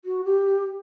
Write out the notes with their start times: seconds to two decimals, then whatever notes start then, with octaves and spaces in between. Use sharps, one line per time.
0.05 F#4
0.25 G4